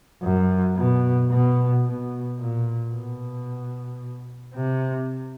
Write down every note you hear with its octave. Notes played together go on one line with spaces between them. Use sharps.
F#2
B2
B2
B2
A#2
B2
C3